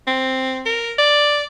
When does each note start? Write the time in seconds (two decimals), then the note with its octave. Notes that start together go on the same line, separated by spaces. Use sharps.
0.07 C4
0.66 A#4
0.98 D5